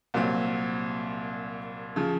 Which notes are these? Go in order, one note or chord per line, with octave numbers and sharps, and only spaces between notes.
C2 A#2 F#3 C4
C#3 F3